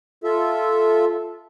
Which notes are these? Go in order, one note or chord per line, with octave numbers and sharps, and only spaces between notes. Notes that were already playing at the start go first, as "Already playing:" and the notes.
F4 A4 E5